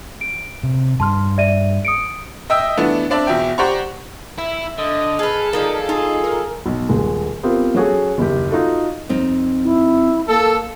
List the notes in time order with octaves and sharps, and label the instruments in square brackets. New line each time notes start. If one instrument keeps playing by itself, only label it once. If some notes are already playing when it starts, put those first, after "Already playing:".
[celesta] D7
[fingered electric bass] C3
[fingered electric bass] G2 [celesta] A5 C6 F6
[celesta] D5 E5 D#7
D#6 C#7 D7
[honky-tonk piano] D#5 E5 G5 E6
E3 A3 B3 D4
C4 D4 D5 E5 A5
E2 B2 E5 G5
G4 C5 D5 F#5 A#5 C#6
[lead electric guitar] E4 [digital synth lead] E5
[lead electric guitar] D3 [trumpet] D#5
[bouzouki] G#4 B4 [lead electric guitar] A4 [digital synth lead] F6
[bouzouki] F3 G#4 D5 [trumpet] D#4 [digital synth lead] A#4
[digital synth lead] D#4 [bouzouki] F4 [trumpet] G#4
[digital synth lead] A#4
[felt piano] B1
D#1 G#3
B3 C4 F4 G4 A#4
F#3 C#4 F#4 G#4 A4
F#1 D#2 G4
D#4 F4 F#4 A4
[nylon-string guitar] F2 C4 D#4
[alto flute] E4
[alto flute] A#3 [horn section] A4